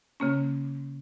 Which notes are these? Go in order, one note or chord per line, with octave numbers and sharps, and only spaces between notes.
C#3 A#3 C#4